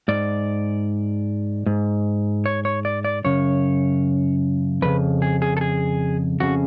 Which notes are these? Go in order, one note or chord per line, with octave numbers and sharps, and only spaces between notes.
G#2 D5
G#2
C#5
C#5
D5
D5
F#2 C#3 C#5
F2 C#3 B4
G#4
G#4
A4
G#4
F2 C#3 F#4